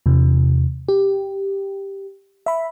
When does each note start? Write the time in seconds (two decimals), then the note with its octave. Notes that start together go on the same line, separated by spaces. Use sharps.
0.06 E2 C3
0.89 G4
2.46 E5 B5